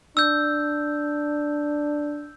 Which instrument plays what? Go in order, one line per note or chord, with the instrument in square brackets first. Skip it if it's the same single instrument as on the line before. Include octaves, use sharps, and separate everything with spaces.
[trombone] D4 [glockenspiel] E6 G6